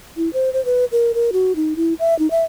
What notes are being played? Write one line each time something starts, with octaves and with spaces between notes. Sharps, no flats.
E4
C5
C5
B4
A#4
A#4
F#4
D#4
E4
E5
D#4
E5